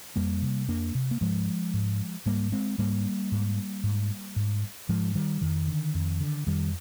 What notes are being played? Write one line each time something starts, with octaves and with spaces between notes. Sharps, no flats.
F2 G3 A#3
C3
F2 A#3 D4
C3
A#3
G#2 F3 G#3
G#2
G#2 G3 A#3
G#3 C4
G#2 G3 A#3
G#2
G#2
G#2
G#2 F3 G#3
D#3 G3
F2 D#3
D3
F2
D3
F2 D#3 G3